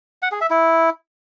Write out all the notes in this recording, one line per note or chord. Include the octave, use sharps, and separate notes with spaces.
F#5
G#4
E5
E4